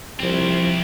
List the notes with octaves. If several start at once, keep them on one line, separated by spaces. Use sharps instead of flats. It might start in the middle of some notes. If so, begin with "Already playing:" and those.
C2 F3 C4 E4